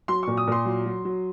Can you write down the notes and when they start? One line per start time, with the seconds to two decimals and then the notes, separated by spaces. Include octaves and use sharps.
0.08 F#3 C6
0.23 A#2 C#6
0.37 D#6
0.47 A#2 C6
0.65 F#3
0.86 F#3
1.05 F#3